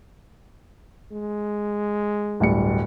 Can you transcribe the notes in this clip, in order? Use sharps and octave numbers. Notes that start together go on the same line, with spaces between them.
G#3
D1 G2 C#7